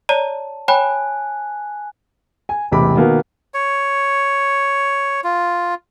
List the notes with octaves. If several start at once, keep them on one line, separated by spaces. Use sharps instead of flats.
C#5 D5 A5 A#5
C#5 G5 G#5 B5 F#6
G#5
E1 A1 C3 B5 D6
B2 D#3 A#3 B3
C#5
F4